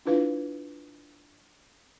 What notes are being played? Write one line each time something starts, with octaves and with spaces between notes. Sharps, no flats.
D4 E4 F4 B4 F5